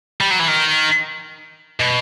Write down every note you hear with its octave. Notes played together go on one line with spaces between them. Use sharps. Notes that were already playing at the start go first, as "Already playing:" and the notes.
G3
F#3
E3
D#3
B2